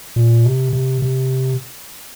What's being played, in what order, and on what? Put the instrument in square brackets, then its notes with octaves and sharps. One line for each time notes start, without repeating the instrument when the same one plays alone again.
[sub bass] A#2
C3
C3
C3